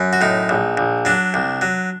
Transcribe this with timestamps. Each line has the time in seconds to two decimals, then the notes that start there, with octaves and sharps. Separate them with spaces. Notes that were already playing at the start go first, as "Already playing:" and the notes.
Already playing: F#2
0.13 F#4
0.21 A2 D#4
0.49 A#1
0.77 A#1
1.05 F#3 D4
1.34 C2
1.61 F#3